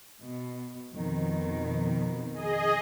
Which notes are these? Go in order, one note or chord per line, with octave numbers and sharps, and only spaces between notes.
B2
F2 B2 D#3
G#4 D#5